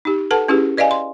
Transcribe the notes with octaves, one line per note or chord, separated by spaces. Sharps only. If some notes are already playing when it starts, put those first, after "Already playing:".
D#4 G4
A4 B4 F#5 A5
C#4 E4 G4 G#4 B4
B4 D5 D#5 F5 G#5
C6